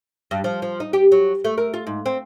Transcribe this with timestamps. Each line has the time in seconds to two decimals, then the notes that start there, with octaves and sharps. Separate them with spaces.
0.31 G2
0.44 F3
0.62 F3
0.80 D#4
0.93 G4
1.12 F#3
1.44 A3
1.58 A#4
1.74 F4
1.87 G#2
2.06 C4